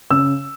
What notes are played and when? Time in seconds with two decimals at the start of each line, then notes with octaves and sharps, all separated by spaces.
0.11 C#3 E6